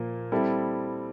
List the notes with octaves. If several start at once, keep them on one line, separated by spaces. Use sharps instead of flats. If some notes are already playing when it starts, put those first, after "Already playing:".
Already playing: A#2 F3 A#3
G3 C4 E4 A4